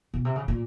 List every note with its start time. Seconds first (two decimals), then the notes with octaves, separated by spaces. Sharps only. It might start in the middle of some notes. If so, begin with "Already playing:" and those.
0.14 B2
0.25 C3
0.36 C#3
0.48 A#2